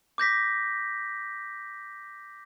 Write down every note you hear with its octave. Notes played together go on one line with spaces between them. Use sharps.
D6 G6 A#6 B6